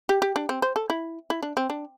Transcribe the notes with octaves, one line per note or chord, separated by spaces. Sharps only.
G4
G4
D4
C4
C5
A4
E4
E4
D4
C4
D4